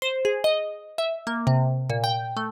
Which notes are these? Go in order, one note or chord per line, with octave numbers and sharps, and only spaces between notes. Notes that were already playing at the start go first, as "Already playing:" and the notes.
C5
G#4
D#5
E5
A#3
C3
A#2
G5
A3